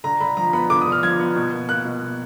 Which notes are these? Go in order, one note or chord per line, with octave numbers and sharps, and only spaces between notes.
D3 A#5
D3 B5
F3 A#5
B3 B5
D3 D6
D#6
D3
F6
F3 G#6
B3
B2
A#3
A#3 F#6
B2
B2